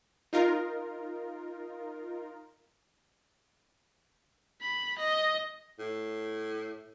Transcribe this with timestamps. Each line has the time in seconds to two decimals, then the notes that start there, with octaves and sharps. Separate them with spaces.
0.33 D#4 F4 A#4
4.62 B5
4.98 D#5
5.79 A2